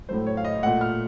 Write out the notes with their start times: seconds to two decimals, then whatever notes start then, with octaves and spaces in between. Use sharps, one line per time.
0.09 A2 F#3 A3 C5
0.27 C#5
0.37 F5
0.45 D#5
0.62 A#2 A3 F#5
0.81 F6